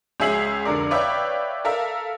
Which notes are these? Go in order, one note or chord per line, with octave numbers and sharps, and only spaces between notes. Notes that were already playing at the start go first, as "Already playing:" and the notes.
C#2 C#4 G#4 E5 C7 F#7
F1 D3 A#4 D5
B4 C#5 D5 E5 F5 G5
A4 A#4 E5 F5